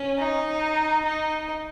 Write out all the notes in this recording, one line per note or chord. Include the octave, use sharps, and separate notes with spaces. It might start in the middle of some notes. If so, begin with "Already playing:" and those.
Already playing: C#4
D#4
D#4